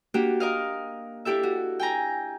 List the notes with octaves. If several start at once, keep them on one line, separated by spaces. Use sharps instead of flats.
A#3 D4 F#4 G4
A#4 D#5 F5
D4 E4 G4 A4 E5
F#4
G5 G#5 A#5